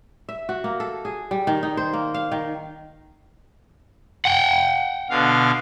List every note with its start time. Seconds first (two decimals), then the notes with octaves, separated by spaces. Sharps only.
0.29 E5
0.49 F#4
0.64 A#3
0.80 A4
1.05 G#4
1.31 G3
1.47 D#3
1.63 D#4
1.77 C5
1.93 A#3
2.14 F5
2.32 D#3
4.25 F#5 G5
5.10 B2 D3 F5